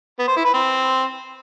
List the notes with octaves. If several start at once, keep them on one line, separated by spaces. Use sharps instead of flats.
B3
C5
E4
B4
C4